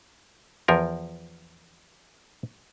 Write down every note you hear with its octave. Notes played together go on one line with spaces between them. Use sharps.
E2 F3 A#4